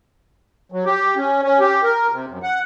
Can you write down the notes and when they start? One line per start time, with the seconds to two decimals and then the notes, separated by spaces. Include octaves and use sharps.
0.72 F#3
0.86 G4
1.17 C#4
1.43 C#4
1.60 G4
1.83 A#4
2.11 C3
2.28 F#2
2.43 F#5